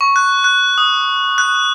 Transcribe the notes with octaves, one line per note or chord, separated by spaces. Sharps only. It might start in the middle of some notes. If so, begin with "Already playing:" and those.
C#6
F#6
F#6
D#6
F#6